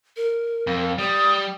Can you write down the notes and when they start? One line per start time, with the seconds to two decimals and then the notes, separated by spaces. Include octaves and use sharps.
0.17 A#4
0.67 F2
0.98 G3 D#6